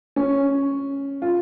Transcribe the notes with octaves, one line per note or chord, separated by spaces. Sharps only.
C#4
F4